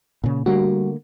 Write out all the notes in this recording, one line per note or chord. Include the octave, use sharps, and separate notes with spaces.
A#2 C#3
D3 G3 A3 A#3 F#4